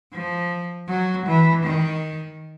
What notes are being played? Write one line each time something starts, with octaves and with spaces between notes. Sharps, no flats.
F3
F#3
E3
D#3